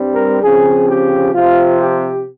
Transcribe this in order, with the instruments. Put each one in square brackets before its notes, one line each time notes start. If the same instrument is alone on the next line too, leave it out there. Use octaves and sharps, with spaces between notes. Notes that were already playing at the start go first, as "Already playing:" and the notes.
Already playing: [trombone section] G2 G3 C4
A#4
C#3 F3 C4 G#4
G4
C3 F3 C4 F4
G4